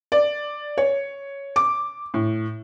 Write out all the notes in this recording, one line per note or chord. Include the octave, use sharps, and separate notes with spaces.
D5
C#5
D6
A2